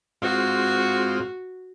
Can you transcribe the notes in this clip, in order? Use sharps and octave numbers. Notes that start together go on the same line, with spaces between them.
G#2 C4 F4 F#4